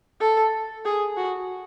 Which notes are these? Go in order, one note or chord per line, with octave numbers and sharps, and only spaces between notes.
A4
G#4
F#4